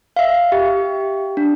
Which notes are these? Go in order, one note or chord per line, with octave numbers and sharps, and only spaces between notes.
E5 F5
G4
D4